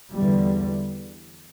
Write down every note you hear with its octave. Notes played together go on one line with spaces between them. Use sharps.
E2 D3 G3